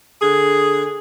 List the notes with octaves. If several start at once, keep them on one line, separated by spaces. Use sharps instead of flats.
D3 G#4